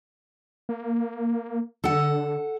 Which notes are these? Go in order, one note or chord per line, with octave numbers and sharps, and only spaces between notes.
A#3
D3 A4 F#5